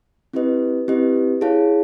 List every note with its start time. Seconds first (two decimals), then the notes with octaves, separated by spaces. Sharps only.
0.33 C4 E4 G4 B4 D#5
0.88 C4 E4 G4 B4 D#5
1.41 E4 G#4 C#5 F5 A5